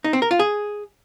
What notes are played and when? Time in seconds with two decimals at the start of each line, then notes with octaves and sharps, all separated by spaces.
0.04 D#4
0.13 C4
0.22 A#4
0.31 F4
0.39 G#4